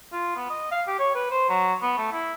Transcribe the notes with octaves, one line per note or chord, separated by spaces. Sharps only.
F4
B3
D#5
F5
G4
C#5
B4
C5
F#3
B3
A3
E4